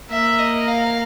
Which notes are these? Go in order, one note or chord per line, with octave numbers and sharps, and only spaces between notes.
A#3 E5
D#5
F5